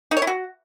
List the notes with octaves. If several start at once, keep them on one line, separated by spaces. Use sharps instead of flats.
D#4
C#5
E4
F#4